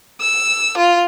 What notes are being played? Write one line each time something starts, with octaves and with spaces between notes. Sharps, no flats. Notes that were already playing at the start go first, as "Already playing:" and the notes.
E6
F4